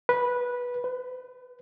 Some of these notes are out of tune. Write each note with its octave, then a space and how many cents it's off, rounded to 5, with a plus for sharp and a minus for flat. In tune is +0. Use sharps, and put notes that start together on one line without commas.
B4 -15
B4 +35